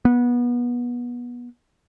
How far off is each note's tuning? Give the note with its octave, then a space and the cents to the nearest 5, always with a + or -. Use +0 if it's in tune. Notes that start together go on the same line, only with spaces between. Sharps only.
B3 -25